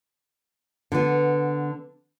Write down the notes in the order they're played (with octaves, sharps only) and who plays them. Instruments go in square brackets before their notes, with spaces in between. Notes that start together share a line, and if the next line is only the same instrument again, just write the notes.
[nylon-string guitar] D3 B3